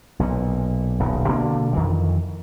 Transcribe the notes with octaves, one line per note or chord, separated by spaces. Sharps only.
B1 A#2
D#1 B1 E2
B2 D3 A#3 D4
F2 D#3 E3